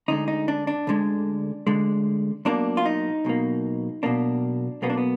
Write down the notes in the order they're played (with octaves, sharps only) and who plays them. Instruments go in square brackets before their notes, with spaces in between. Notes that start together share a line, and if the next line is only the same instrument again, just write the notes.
[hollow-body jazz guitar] D2 D3 G#3 D#4
D#4
D4
D4
D2 D3 G#3
D2 D3 G#3
B1 B2 A#3 D4
F4
D#4
B1 B2 A#3
B1 B2 A#3 D4
B1 B2 A#3 B3
D4
B3